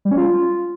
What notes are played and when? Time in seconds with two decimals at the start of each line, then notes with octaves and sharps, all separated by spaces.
0.05 G3
0.11 C#4
0.18 F4